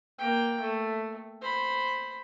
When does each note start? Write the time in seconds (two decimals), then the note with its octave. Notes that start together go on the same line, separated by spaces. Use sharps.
0.18 A#3 G5
0.61 A3
1.41 C5 B5